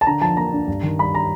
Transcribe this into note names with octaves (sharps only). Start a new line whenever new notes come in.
A5
D3 A#5
F3 A5
A#3 A#5
D4
G2
D#3
G3 B5
A#5